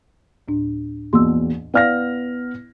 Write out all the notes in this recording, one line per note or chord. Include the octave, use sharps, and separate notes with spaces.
D2 A2 D4
A#1 E2 B2 C6 E6
B3 E4 D5 F5 F6 A#6